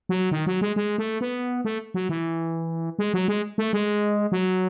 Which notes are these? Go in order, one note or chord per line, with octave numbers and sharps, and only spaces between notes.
F#3
D#3
F#3
G#3
G#3
A3
B3
A3
F#3
E3
G#3
F#3
G#3
A3
G#3
F#3